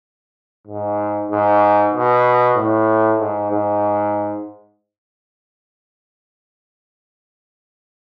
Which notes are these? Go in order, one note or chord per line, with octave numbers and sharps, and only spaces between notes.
G#2
G#2
B2
A2
G#2
G#2